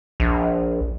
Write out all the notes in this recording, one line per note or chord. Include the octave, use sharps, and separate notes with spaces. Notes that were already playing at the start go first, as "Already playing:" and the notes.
A#1